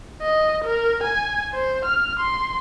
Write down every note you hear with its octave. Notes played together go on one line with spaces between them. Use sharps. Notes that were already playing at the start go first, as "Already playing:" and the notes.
D#5
A#4
G#5
C5
F6
C6